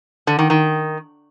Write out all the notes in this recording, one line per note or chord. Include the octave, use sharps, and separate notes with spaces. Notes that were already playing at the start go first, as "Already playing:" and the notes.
D3
D#3
D#3